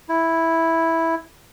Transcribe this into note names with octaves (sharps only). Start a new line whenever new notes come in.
E4